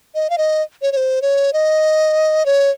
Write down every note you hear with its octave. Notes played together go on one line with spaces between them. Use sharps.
D#5
F5
D#5
C#5
C#5
C5
C#5
D#5
C#5